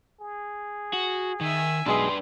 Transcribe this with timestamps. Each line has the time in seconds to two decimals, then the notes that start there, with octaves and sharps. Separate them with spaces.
0.21 G#4
0.93 F#4
1.41 D#3 E5 G#5
1.86 B1 G#3 D4 G#4 B4 C6